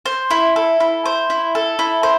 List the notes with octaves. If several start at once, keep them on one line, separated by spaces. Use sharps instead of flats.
C5
E4
A4
E4
C5
E4
A4
E4
C5